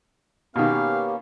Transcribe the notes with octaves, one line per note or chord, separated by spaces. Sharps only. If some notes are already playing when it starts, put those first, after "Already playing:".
B2 D#3 A#3 B3 C#4 G4 F5